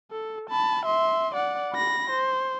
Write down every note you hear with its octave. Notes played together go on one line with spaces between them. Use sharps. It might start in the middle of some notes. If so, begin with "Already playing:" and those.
A4
A5 B5
E5 C6
D5 F#5
B5 A#6
C5